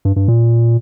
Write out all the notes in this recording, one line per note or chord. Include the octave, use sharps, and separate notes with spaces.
G2
G2
A#2